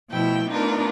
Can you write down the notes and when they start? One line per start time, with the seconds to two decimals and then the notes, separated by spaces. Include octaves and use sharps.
0.11 B2 F3 A3 E4 G5 G6
0.49 A3 B3 D4 D#4 F4 A#4